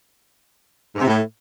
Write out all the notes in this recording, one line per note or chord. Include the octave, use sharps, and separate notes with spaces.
G#2
C3
A2